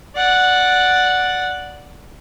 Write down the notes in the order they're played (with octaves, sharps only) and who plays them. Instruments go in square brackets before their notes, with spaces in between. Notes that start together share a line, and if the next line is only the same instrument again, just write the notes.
[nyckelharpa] D5 F#5